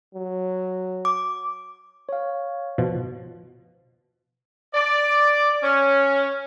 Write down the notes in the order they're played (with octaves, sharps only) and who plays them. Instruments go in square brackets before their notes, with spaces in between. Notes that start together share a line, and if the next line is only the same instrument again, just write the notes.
[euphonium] F#3
[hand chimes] D6
[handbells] C#5 F5
[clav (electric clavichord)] B2 F3
[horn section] D5
C#4